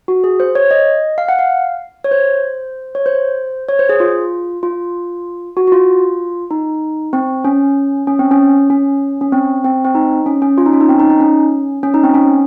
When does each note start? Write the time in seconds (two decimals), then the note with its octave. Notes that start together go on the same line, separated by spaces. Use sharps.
0.08 F#4
0.24 G#4
0.40 C5
0.55 C#5
0.71 D#5
1.18 F5
1.29 F#5
1.39 F5
2.04 C#5
2.11 C5
2.95 C#5
3.06 C5
3.68 C#5
3.79 C5
3.89 G#4
4.00 F4
4.63 F4
5.57 F#4
5.67 F#4
5.72 F4
6.51 D#4
7.13 C4
7.45 C#4
8.07 C#4
8.19 C4
8.31 C#4
8.70 C#4
9.21 C#4
9.32 C4
9.64 C4
9.85 C4
9.95 D#4
10.26 C#4
10.42 C#4
10.58 F4
10.66 D#4
10.73 C#4
10.81 D#4
10.89 C4
10.99 D#4
11.10 D#4
11.20 C#4
11.83 C#4
11.94 D#4
12.04 C4
12.14 C#4